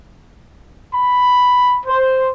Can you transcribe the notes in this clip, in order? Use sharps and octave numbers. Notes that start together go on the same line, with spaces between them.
B5
C5